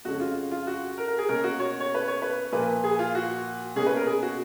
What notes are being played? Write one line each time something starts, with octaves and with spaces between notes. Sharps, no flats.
F2 C#3 G#3 C#4 F#4
F4
F4
F#4
A#4
A#4
G#4
B2 A#3 C#4 A#4
F#4
C#5
C#5
B4
C#5
B4
A#2 F3 A#3 B4
G#4
F4
F#4
B2 A#3 C#4 G#4
B4
A#4
G#4
F#4